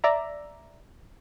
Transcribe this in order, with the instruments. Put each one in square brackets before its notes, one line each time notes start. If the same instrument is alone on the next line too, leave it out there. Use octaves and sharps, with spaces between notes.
[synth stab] D5 E5 A#5